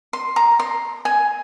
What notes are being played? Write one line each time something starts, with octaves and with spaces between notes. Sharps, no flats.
C6
A#5
C6
G#5